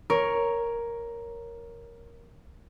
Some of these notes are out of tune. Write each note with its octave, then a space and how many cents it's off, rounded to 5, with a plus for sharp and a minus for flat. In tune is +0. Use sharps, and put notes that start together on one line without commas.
A#4 +5 C#5 +0